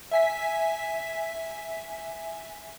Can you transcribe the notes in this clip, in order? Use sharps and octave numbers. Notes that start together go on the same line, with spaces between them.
E5 G#5 B6